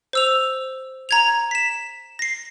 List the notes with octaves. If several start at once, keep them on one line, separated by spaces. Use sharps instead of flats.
C5 E6 F7
A#5 G#6 F7
B6 E7
A#6 C7